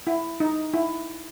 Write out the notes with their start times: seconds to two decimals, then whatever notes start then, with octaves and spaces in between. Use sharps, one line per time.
0.07 E4
0.40 D#4
0.74 E4